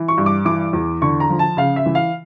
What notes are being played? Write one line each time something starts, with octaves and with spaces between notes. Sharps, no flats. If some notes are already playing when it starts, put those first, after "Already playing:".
Already playing: E3
C#6
G2
D6
E3 D6
E2
D3 C#6
A#5
F3
A5
C#3 F5
E5
E3
F5